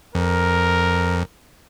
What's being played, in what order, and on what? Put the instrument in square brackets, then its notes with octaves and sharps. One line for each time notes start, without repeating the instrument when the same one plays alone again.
[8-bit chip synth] F2 [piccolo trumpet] A#4